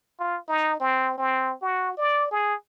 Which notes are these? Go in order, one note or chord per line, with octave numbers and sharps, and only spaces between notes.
F4
D#4
C4
C4
F#4
D5
G#4